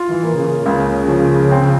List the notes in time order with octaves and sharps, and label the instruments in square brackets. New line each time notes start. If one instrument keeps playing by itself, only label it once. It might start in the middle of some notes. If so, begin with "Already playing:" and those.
Already playing: [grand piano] F4
[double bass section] E3
[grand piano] A#3
[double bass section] C#3
[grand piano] C#2 [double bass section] C#3
[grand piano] F3
C4